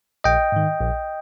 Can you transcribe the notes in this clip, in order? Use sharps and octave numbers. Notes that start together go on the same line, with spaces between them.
A#1 D#5 G5
G#2 D#3
A#1